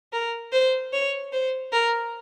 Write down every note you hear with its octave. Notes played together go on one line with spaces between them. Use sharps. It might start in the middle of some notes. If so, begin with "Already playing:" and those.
A#4
C5
C#5
C5
A#4